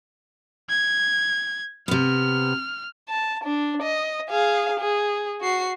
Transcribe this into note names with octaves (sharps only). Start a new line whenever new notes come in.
G#6
C3 B3 F6
A5
D4
D#5
G#4 F5
G#4
F#4 C7